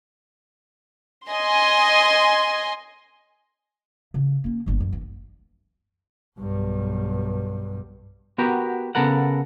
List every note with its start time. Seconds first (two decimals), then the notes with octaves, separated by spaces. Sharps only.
1.28 D#5 G#5 C6
4.14 C#3
4.44 A#3 C#4
4.66 G1 D3
4.80 F#2
4.92 E3
6.39 B1 G2
8.38 B3 F#4 G4 A#4
8.95 C#3 B3 A4 A#4 F#5